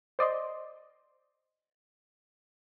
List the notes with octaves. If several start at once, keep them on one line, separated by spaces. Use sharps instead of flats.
C5 D5 D#5 C6